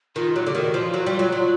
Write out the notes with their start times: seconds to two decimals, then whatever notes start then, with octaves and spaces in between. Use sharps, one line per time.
0.16 D#3 F4
0.35 F#3 G4
0.47 D3
0.55 D#3 F#4
0.74 F3 F4
0.94 F#3 F#4
1.06 G3
1.13 F4
1.19 F#3
1.32 F#3 F4